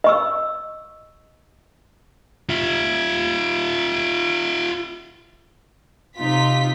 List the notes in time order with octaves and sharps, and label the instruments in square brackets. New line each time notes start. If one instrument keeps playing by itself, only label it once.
[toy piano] D#5 C#6 E6
[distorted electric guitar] F4 E5
[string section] C3 D#4 F4 B6